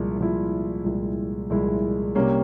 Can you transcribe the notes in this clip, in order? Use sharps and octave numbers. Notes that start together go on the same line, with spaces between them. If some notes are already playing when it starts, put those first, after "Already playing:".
Already playing: C2 A#2 F3 G#3 E4
C2 A#2 F3 G#3 E4
C2 A#2 F3 G#3 E4
C2 A#2 F3 G#3 E4
C3 G3 A#3 C#4